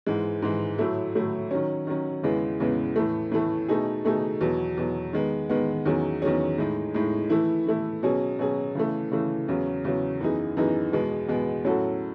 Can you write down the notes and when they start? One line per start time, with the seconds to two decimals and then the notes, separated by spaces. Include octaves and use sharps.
0.06 G#2 E3 G#3
0.42 G#2 E3 G#3
0.78 A2 F#3 A3 E4
1.15 A2 F#3 A3 E4
1.51 D#3 F#3 C#4
1.87 D#3 F#3 C#4
2.23 E2 C#3 E3 G#3 B3
2.60 E2 C#3 E3 G#3 B3
2.96 A2 E3 A3
3.32 A2 E3 A3
3.68 B2 A3 D#4 G#4
4.05 B2 A3 D#4 G#4
4.41 E2 B2 F#3
4.77 E2 B2 F#3
5.13 D#3 G#3 B3
5.49 D#3 G#3 B3
5.85 E2 D#3 F#3 C#4 G#4
6.22 E2 D#3 F#3 C#4 G#4
6.58 A2 G#3 D#4
6.94 A2 G#3 D#4
7.30 E3 A3 E4
7.67 E3 A3 E4
8.03 B2 F#3 C#4 G#4
8.39 B2 F#3 C#4 G#4
8.75 C#3 E3 A3
9.12 C#3 E3 A3
9.48 E2 C#3 F#3 C#4
9.84 E2 C#3 F#3 C#4
10.20 F#2 E3 B3 D#4 G#4
10.57 F#2 E3 B3 D#4 G#4
10.92 E2 B2 G#3 B3
11.28 E2 B2 G#3 B3
11.64 A2 F#3 C#4 F#4 A4